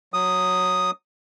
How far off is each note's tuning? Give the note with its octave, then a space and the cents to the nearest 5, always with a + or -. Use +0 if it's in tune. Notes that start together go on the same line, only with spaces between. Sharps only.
F#3 -5 D#6 +0